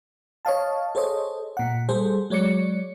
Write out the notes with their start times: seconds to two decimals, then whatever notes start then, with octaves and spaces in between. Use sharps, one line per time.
0.45 C#5 D#5 F5 A5
0.95 G#4 A4 C5 C#5 D#5
1.57 A#2 F#5
1.89 G3 G#4 A4 C5
2.30 F#3 G#3 C#5 D5 C#7